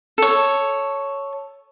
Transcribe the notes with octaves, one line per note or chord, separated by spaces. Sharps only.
A4 C#5